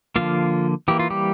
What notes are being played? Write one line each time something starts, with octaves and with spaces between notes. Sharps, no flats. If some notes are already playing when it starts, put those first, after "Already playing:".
D3 F3 A#3 F4 F5
E3 A#3 G4
F4
G3 G4